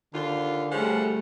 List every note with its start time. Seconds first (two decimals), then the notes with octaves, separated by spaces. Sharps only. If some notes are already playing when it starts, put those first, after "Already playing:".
0.14 D#2 D3 D#4 F4
0.71 F3 G3 A3 C#4 G#4 F#5 G#5